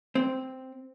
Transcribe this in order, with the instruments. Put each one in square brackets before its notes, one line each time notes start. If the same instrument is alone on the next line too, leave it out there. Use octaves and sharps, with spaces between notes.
[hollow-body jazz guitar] C4